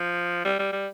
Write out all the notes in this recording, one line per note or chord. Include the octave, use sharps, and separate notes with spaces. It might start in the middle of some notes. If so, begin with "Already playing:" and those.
Already playing: F3
G3
G3
G3